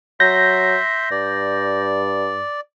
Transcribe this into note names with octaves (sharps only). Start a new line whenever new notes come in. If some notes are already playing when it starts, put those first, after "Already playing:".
F#3 E5 C6 G6 A#6
G2 D5